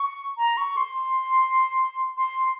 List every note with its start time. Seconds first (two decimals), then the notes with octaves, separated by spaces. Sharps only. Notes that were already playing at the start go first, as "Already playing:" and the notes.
Already playing: C#6
0.38 A#5
0.57 C#6
0.77 C6
2.17 C6